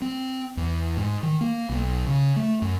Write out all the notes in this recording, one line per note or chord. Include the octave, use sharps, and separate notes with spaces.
C4
E2
G#2
D#3
A#3
B1
C#3
A3
F#2